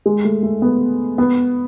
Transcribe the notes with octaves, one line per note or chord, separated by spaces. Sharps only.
G#3
A3
A3
B3
B3